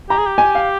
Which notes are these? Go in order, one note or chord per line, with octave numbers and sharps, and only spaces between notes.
G4 A#5
G#4
G4
G#5
F5